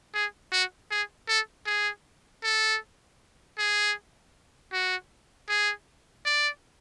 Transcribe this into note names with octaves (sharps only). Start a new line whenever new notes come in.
G#4
F#4
G#4
A4
G#4
A4
G#4
F#4
G#4
D5